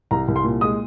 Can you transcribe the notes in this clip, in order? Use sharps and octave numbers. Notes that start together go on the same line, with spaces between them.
C2 A#5
C2
C6
A#2
G#3 D#6